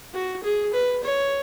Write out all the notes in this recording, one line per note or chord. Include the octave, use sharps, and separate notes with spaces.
F#4
G#4
B4
C#5